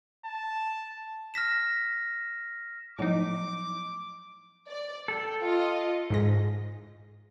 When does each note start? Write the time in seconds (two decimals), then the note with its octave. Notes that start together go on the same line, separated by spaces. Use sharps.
0.25 A5
1.34 F6 A#6 B6 E7
2.98 A2 F3 F#3 B3 D#4 D6
4.68 D5
5.08 A4 G5
5.41 F4 D#5
6.10 G#2 G#3 A#6